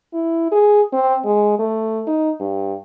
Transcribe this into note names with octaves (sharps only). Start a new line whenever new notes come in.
E4
G#4
C4
G#3
A3
D#4
G2